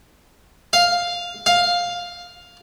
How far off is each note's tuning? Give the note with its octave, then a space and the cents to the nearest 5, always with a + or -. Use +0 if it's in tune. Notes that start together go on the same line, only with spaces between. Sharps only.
F5 +5
F5 +10